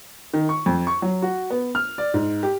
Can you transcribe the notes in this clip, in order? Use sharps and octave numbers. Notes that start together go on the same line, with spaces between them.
D#3
C#6
F2
C#6
F#3
F#4
B3
F6
D5
G#2
G4